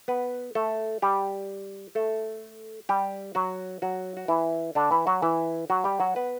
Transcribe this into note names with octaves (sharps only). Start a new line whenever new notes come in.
B3 B4
A3 A4
G3 G4
A3 A4
G3 G4
F#3 F#4
F#3 F#4
F#4
E3 E4
D3 D4
E3 E4
F#3 F#4
E3 E4
F#3 F#4
G3 G4
F#3 F#4
B3 B4